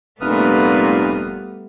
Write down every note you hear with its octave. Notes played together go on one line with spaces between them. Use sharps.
F1 A#2 G3 A3 B3 B4 D#6 F6